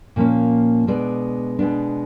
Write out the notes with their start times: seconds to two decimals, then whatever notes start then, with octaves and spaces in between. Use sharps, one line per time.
0.16 A#2 F3 A#3 C#4
0.87 B2 G#3 B3 D4 D5
1.59 B2 G#3 B3 D4